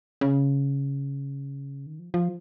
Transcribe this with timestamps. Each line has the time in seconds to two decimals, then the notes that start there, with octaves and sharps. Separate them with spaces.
0.21 C#3
1.86 D#3
1.99 F3
2.14 F3